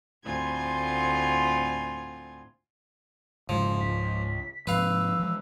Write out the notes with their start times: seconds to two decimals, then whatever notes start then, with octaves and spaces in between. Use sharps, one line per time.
0.24 D2 A2 C4 F4 G#5 G#6
3.49 F1 G#2 C#3 F3 G#3
3.80 C#2 B6
4.67 G#2 C3 F3 B4 F5 E6
5.19 E3 G#3